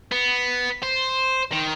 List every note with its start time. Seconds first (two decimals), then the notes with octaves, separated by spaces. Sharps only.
0.12 B3
0.83 C5
1.52 D#3